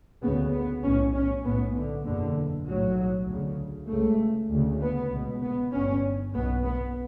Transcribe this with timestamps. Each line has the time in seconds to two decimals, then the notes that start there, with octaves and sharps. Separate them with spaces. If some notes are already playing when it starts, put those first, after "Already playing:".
0.22 D2 C#3 B3
0.53 B3
0.83 B1 A2 C#4
1.14 C#4
1.44 B1 A2 B3
1.75 D3
2.05 F#1 E2 B2 D3
2.66 B1 A2 F#3
3.27 D2 C#3
3.89 C#2 C#3 A3
4.51 D2 C#3
4.80 B3
5.11 C#2 B2
5.42 B3
5.72 G1 G2 C#4
6.33 B1 B2 B3
6.64 B3